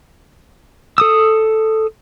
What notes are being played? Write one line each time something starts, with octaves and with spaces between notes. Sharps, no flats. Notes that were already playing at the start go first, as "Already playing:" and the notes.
A4 D#6 E6